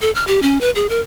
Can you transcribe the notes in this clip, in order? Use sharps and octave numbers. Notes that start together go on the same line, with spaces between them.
A4
F6
G4
C#4
B4
G#4
A#4